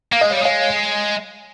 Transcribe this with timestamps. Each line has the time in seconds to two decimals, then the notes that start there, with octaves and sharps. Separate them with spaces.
0.12 A#3 F5
0.21 G#3 D#5
0.30 G3 C#5 F5
0.43 G#3 C#5 F5